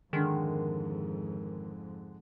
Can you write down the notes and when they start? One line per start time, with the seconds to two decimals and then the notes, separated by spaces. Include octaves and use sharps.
0.13 F2 G#2 D3 D#3 G#3